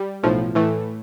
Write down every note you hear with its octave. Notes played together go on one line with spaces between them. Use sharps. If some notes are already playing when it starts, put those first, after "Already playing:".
Already playing: G3
B1 A2 F3
A2 E3 A3